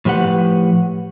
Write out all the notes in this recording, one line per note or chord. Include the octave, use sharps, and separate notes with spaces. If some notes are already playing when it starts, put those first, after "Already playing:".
A2 F3 G4 B4 F#5